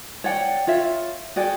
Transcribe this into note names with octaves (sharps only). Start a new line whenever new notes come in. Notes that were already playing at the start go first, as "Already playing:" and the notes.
C#5 D5 F#5 G5
F4 C#5 E5
F#4 G#4 D5 G5